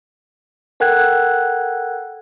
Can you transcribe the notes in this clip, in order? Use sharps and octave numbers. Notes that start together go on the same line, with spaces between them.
A4 A#4 F#5 G5 F#6 G#6